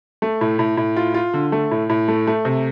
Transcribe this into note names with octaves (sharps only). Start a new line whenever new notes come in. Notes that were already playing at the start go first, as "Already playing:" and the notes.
A3
A2
A2
A2
F4
F4
D3
A3
A2
A2
A3
A3
C3